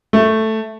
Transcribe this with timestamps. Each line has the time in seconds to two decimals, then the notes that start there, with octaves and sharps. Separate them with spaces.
0.13 A3